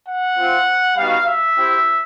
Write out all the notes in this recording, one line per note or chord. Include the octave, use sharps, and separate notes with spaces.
F#5
C4 F4
G3 B3 D#4 F#4 F5
E5
C4 E4 G4